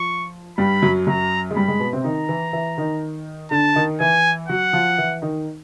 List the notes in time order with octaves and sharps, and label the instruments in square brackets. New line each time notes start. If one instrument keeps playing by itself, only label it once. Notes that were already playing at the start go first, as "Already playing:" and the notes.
Already playing: [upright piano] F3 [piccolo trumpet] C#6
[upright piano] G2 G3 [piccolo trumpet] B5
[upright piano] F#2 F#3
[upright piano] F#2 F#3 [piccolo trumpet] A#5
[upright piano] G#3
[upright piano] G2 G3 [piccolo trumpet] B5
[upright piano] G#2 G#3
B2 B3
C3 C4
[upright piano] D#3 D#4 [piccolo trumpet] A#5
[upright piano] E3 E4
E3 E4
D#3 D#4
[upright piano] D3 D4 [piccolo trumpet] A5
[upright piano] D#3 D#4
[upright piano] E3 E4 [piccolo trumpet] G#5
[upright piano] F#3 F#4 [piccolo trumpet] F#5
[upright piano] F3 F4
E3 E4
D#3 D#4